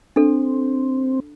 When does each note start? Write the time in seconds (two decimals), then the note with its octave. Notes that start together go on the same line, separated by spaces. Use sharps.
0.16 C4 D4 A4